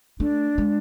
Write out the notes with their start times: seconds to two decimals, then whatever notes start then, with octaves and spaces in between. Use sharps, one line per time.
0.20 A3 D4
0.58 G#3